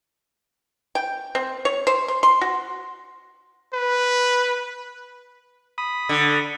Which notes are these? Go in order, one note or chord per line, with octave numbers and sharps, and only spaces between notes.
G5
C4
C#5
C5
C6
C6
F#4
B4
B5 D#6
D3